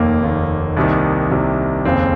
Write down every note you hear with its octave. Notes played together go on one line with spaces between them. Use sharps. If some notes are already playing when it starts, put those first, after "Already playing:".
Already playing: F1 D#2 D#3 A#3
F1 D#2 D#3
C2 C3 D#3
C2 C3 D#3
F1 D#2 C#3 C4